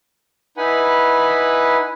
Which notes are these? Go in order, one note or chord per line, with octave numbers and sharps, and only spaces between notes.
D#4 E4 B4 F#5 G#5 B5